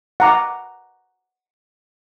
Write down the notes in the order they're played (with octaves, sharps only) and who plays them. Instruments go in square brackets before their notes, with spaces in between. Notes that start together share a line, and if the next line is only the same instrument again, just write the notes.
[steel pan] F#5 A#5 D6